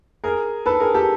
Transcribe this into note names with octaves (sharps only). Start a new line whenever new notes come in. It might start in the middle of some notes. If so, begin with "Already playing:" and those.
G#4 A#4
A4 B4
G#4 A#4
G4 A4